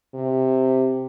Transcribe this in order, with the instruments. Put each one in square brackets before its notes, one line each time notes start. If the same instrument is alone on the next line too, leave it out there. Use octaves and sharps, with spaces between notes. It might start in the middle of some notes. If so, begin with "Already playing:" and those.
[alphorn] C3